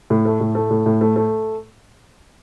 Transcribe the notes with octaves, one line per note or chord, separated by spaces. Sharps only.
A2
A3
A2
A3
A2
A2
A3
A3